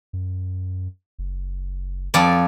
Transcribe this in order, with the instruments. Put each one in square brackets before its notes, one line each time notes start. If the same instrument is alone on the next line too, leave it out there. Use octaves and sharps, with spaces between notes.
[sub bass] F#2
F#1
[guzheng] F2 D5